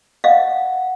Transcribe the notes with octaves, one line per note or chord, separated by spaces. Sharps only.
D#5 F5 F#5